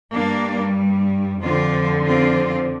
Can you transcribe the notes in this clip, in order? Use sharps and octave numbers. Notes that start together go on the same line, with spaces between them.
G2 G3 A#3 D4
F2 D3 F3 C4 F4
C4 F4